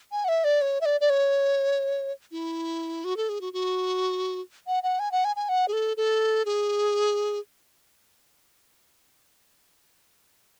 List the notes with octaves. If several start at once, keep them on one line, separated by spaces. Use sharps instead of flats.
G#5
F#5
E5
D5
C#5
E5
D5
D5
C#5
E4
F#4
A4
G#4
F#4
F#4
F#5
F#5
G#5
F#5
G#5
G#5
F#5
G#4
A4
A4
G#4